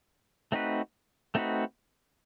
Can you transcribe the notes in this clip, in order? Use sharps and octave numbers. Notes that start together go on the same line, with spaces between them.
A3 C4 D#4 F#4 B4
A3 C4 D#4 F#4 B4